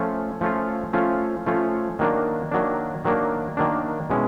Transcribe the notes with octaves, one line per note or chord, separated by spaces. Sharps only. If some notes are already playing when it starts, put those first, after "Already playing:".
Already playing: F3 A3 C#4 F4
F3 A3 C#4 F4
F3 A3 C#4 F4
F3 A3 C#4 F4
D#3 F#3 A#3 D4
D#3 F#3 A#3 D4
D#3 F#3 A#3 D4
D#3 F#3 A#3 D4
B2 G#3 C#4 E4